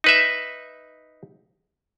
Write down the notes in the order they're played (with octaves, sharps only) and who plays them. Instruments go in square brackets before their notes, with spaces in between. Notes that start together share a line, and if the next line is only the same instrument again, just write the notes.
[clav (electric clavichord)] D#4 B4 E5